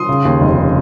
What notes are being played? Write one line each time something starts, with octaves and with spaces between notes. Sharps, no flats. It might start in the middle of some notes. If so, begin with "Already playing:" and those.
Already playing: C6 D#6
C#3
D#2
F1
C#3